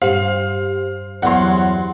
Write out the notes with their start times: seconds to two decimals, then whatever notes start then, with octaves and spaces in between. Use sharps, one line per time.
0.02 G2 G4 C5 F5
1.23 E2 F#3 F#5 C6